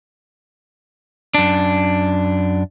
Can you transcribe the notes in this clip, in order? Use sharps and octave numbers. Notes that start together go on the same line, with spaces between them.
F#2 D4